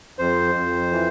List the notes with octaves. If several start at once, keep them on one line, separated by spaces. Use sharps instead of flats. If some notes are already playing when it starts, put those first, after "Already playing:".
F2 C5
F2
E3